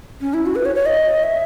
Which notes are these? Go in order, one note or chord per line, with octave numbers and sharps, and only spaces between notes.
C#4
E4
F#4
B4
C#5
C#5
D#5
E5